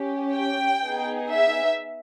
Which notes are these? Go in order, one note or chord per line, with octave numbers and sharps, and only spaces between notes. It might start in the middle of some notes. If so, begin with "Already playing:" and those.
Already playing: C#4 G4
G5
B3 D#4 G#4
E5